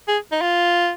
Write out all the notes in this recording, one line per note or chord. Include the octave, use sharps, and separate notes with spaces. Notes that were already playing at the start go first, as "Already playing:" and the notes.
G#4
D#4
F4